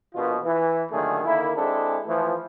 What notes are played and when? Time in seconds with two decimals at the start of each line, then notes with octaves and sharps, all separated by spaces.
0.14 A#1 B2 F4
0.43 E3
0.92 F#2 A#2 D3 D#3 A3 G#4
1.24 D3 D#3 A#3 E4
1.56 G#3 C4 D4 E4 G#4 A4
2.06 E3 F3 A3